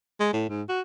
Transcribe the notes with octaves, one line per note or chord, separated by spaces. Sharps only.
G#3
A2
G#2
F#4